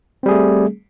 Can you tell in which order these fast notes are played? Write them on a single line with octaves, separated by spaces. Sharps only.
C4 G3 G#4 A3